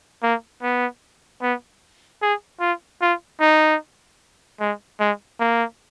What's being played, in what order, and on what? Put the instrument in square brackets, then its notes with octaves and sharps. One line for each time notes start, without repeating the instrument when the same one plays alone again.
[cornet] A#3
B3
B3
G#4
F4
F4
D#4
G#3
G#3
A#3